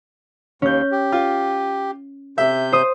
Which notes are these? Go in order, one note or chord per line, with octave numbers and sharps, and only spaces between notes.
D#2 C#4 G6
G4
F4
C3 E5 G6
C5 D#6